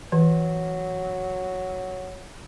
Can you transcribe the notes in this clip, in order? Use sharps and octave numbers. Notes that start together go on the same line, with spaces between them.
E3 F#3